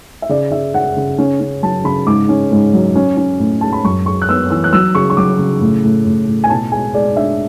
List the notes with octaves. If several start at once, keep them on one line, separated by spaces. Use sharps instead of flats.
E5
C#3 D5
C#3 E5
C#3 F#5
C#3
C#4
C#4
F#3 A5
C#3 B5
G#2 D6
C#4
G#2
F#3
C#4
C#4
A2
G#3 A5
B5
F#2 C#6
G#3 C#6
F#6
B3 E6
E3 E6
F#6
F#3 E6
C#3 C#6
C#6
F#3 D6
C#3
A2
A2
A2
A2
G#5
B2 A5
G#3 G#5
G#3 D5
D4 E5